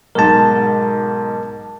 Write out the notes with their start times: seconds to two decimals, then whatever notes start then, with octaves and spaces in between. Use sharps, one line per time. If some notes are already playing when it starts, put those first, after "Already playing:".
0.15 B1 G#2 A#4 A5